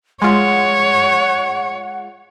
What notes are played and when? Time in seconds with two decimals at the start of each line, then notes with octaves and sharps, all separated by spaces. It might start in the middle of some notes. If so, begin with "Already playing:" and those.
0.22 G#3 F4 C#5 F#5